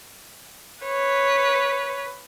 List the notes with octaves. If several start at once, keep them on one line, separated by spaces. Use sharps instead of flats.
B4 C#5